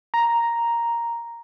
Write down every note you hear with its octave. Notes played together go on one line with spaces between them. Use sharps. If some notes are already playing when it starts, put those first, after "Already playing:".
A#5